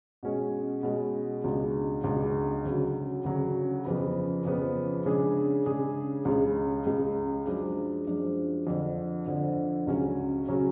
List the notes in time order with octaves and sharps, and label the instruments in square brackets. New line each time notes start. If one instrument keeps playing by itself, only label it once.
[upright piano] B2 G#3 C#4
B2 G#3 C#4
C#2 B2 G#3 D4
C#2 B2 G#3 D4
D2 C#3 F#3
D2 C#3 F#3
F2 C#3 F3 B3
F2 C#3 F3 B3
C#3 G#3 D4 G#4
C#3 G#3 D4 G#4
C#2 C#3 G#3
C#2 C#3 G#3
F#2 F3 G#3 D4
F#2 F3 G#3 D4
F2 D3 F3
F2 D3 F3
C#2 C#3 F#3 C#4 F#4
C#3 F#3 C#4 F#4